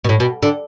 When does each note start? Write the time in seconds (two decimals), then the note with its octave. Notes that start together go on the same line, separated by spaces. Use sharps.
0.04 B2
0.09 A2
0.20 B2
0.43 D3